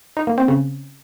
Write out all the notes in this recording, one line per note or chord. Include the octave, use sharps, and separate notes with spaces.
D#4
A#3
C4
C#3